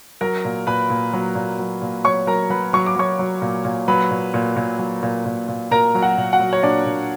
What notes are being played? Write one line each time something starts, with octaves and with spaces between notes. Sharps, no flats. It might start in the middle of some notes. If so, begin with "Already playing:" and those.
F#3 A#4 A#5
A#2
A#2 B4 B5
A#2
F#3
A#2
F#3
A#2
F#3 C#5 C#6
F#3 A#4 A#5
F#3 B4 B5
F#3 C#6
D6
F#3 C#5 C#6
F#3
A#2
A#2
F#3 B4 B5
A#2
A#2
A#2
F#3
A#2
A#2
A#2
A#2 A#4 A#5
F#3
F#4 F#5
A#2
F#4 F#5
F#3
C#5
A#2 D4 D5
A#2